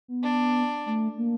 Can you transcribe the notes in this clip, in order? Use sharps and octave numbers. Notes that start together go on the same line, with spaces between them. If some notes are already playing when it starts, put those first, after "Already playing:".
B3
D4
A3
A#3